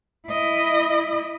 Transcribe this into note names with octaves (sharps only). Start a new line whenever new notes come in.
E4 D#5